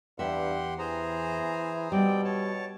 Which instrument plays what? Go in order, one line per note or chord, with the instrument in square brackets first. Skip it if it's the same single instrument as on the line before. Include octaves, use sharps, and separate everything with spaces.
[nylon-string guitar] E2 E5 [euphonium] G2 [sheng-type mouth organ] G4 F#5 C6
[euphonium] E3 [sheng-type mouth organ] G#4 C5 A#5
[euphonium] B2 [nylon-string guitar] G3 [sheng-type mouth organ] C4 D5 G5
[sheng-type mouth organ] C#5 A5